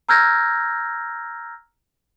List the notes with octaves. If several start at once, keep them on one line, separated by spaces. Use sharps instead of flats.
A#5 E6 F6 G6 G#6 A#6